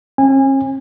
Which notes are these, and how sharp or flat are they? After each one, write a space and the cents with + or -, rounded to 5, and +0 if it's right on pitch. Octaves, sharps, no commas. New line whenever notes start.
C#4 -45 G#5 -25